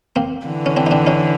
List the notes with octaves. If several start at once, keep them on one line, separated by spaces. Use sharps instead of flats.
A#3 C4
D3 E3
C#4
C4 D4
D#4
C4 D4
C#4 D#4